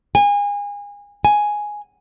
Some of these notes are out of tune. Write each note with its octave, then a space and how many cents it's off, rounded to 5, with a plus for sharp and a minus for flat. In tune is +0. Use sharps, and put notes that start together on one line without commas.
G#5 -30
G#5 +0